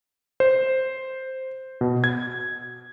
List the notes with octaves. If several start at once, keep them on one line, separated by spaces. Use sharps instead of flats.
C5
B2
G#6